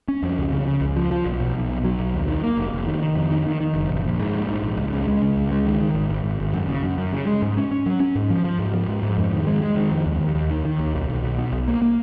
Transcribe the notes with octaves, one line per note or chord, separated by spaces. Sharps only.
C#4
F2
C#2
C#3
C#3
C#2
F3
F3
B1
B2
B1
B1
F#3
B1
D#2
D#3
A#3
F1
F1
D#3
D#3
F2
D#3
D#3
D#3
F#1
A#1
A#1
G#2
A#1
G#2
A#1
C#2
C#3
G#3
C#3
C#2
G#3
D#3
D#3
G#1
G#1
G#1
G#1
F#2
C#3
F#2
F#2
C#3
G#3
G#2
C#4
C#4
F#3
C#4
G#2
F3
F3
G#2
F3
G#2
G#2
F2
D#3
G#3
G#3
D#3
F2
D#2
D#2
D#2
D#3
D#3
D#2
B1
B1
B1
B2
B1
A#3
A#3